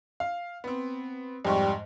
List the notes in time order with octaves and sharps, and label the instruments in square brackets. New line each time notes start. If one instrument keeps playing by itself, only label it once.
[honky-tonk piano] F5
B3 C4
[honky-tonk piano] F2 G#2 C#6 [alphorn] G3